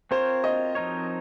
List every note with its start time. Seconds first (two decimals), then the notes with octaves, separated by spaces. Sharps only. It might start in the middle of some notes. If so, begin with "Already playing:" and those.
0.11 C4 F4 A#4 C5 C#5
0.44 D#5
0.75 F3 C4 D#4 A#4 C#5